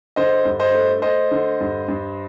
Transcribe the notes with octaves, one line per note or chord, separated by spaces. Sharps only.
D3 C5 D#5
G2
C5 D#5
A3
A3 C5 D#5
D3
G2
G2